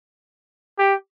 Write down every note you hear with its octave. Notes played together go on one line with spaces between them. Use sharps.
G4